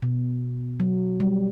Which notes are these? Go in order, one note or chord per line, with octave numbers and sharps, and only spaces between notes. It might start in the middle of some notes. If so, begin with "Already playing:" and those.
B2
F#3
G3